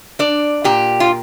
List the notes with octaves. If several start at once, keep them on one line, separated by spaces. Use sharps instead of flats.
D4 D5
A#2 G4
F4